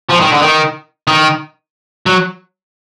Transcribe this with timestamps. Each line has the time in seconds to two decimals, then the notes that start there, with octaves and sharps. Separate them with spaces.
0.09 F3
0.20 D#3
0.32 D3
0.41 D#3
1.07 D#3
2.06 F#3